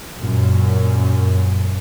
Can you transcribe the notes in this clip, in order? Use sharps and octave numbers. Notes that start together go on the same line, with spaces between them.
F#2 A#2